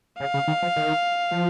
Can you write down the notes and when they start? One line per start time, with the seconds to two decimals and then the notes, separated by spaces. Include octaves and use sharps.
0.20 C#3 F5
0.34 C#3
0.48 D#3
0.62 F3
0.76 D#3
1.31 F3